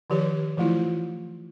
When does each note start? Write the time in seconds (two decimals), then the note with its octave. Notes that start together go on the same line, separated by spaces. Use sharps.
0.10 D#3 F3 G4 B4 C#5
0.57 E3 F3 A3 E4 F4